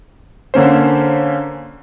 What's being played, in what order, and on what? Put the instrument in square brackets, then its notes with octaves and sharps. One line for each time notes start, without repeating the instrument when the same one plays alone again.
[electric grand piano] D3 A#3 C#4 C5